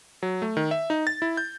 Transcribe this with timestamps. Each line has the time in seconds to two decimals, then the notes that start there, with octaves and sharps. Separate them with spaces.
0.23 F#3
0.42 A3
0.57 D#3
0.71 E5
0.90 D#4
1.07 A6
1.22 E4
1.37 G6